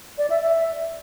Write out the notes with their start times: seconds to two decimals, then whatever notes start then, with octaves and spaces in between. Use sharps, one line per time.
0.18 D5
0.30 E5
0.42 E5